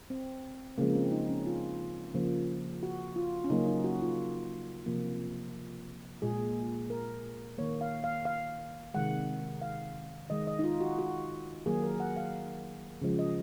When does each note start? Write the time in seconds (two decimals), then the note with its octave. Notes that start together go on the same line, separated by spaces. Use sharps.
0.10 C4
0.78 C#3 F3 G#3 A#3
0.95 C4
1.12 D#4
1.29 C#4
1.46 F4
2.14 C#3 F3 A#3
2.83 F#4
3.16 F4
3.44 C#4
3.50 C#3 F#3 A#3 D#4
3.67 D#4
3.84 F#4
4.02 F4
4.86 C3 F3 A#3
6.22 A#2 G#3 G#4
6.90 A#4
7.58 D#3 A#3 C#5
7.81 F5
8.04 F5
8.26 F5
8.94 C3 D#3 G#3 F#5
9.62 F5
10.30 D#3 G#3 D#5
10.47 D#5
10.59 D#4
10.64 F4
10.81 F#4
10.99 F#4
11.66 D#3 F#3 A#3 G#4
11.83 A#4
12.00 F#5
12.17 F5
13.02 C#3 F3 G#3
13.19 D#5